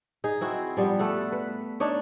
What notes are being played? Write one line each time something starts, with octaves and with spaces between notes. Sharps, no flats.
D#4 G#4
C4 E4 F#4
F3 G3 B3
A3 A4 F#5
B4
D4 D#4 C#5